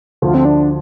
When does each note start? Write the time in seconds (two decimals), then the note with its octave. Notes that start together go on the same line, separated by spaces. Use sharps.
0.22 D2 D3 F3 F4
0.34 C4
0.45 D4